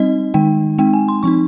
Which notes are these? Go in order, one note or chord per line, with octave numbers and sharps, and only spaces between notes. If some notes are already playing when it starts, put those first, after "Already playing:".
Already playing: G3 C4 D#4 D#5
D#3 G#3 D#4 G5
G#3 C4 D#4 G5
G#5
C6
F3 C4 D#4 C#6